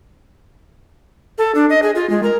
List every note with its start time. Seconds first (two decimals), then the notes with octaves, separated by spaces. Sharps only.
1.38 A4
1.55 D4
1.70 D#5
1.83 G#4
1.95 F4
2.10 G#3
2.23 A#4